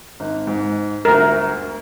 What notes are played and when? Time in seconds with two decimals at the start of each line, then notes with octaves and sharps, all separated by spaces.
0.20 G#1
0.47 G#2
1.05 G1 D2 A#4